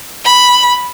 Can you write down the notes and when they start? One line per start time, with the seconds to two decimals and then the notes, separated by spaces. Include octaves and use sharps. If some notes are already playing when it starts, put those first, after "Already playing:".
0.25 B5